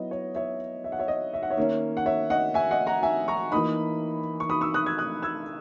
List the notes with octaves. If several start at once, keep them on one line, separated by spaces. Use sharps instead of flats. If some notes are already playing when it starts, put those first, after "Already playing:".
Already playing: F#3 B3 E4 D#5
C#5
C#5 E5
E5
F#5
C#5 E5
D#5
E5
F#5
C#5 E5
D#3 A#3 C#4
F#5
C#5 E5
D#5 F#5
E5 G#5
D#5 F#5
F#5 A#5
E5 G#5
A#5 C#6
E3 A#3 D#4 B5 D#6
C#6
B5 D#6
C#6 E6
D#6 F#6
E6 G#6
D#6 F#6
E6 G#6